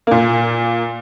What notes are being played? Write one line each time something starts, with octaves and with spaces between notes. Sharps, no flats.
A#2 A#3